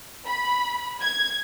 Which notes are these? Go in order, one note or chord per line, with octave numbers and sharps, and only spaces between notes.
B5
G#6